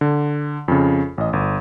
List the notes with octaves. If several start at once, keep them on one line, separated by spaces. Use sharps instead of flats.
D3
F2 C#3
A1 D#5
G1